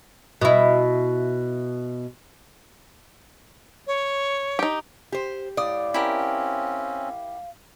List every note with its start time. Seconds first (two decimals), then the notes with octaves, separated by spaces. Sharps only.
0.41 B2 E4
3.87 C#5
4.59 D#4 G4
5.12 G4 C5
5.57 A2 D5 F5 D#6
5.94 C4 C#4 E4 G4 A#4